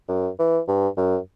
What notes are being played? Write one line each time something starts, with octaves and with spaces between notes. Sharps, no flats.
F#2
E3
G2
F#2